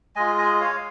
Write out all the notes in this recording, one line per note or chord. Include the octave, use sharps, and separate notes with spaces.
G#3 F4 D#5 G#5
D#5 G#5
C#5 F5